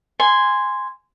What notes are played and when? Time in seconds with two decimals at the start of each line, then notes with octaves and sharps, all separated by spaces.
0.20 G#5 C6